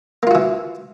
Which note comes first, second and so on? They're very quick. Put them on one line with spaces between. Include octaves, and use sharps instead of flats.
A#3 F4 F#4 E3